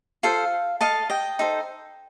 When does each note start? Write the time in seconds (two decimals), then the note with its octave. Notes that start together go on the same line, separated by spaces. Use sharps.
0.23 F4 A4 C5 F5
0.81 A4 D#5 F5 A5
1.10 D#5 G5
1.39 D#4 A4 C5